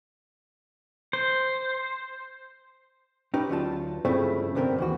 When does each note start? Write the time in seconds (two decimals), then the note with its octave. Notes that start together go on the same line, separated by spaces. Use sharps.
1.13 C5
3.34 C#4 D#4 G4 B4
3.49 D2 F#3 F4 A5
4.05 G2 C#3 F3 A3 C4 E4
4.55 C2 G2 D3 B3 C4 A#4
4.78 D#2 E3 F#4